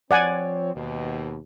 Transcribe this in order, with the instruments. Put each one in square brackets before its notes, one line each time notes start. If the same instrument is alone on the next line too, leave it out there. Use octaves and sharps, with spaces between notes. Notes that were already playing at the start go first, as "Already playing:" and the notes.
[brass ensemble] F3 C4 C#5 [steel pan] D5 F#5 G#5
[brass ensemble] D#2 B2